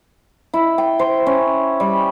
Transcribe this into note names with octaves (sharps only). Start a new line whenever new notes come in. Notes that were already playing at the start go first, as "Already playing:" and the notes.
E4
G5
C5
C#4
G3